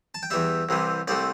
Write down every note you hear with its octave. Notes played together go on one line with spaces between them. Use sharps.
A5
G5
E2 E3 G3 E5
C2 C3 E3 G3
C2 C3 A3 D5